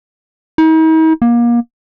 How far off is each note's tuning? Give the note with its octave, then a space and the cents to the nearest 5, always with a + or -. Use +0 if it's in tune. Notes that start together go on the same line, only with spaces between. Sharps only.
D#4 +45
A#3 +30